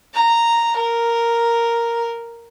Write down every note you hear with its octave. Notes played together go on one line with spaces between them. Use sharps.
A#5
A#4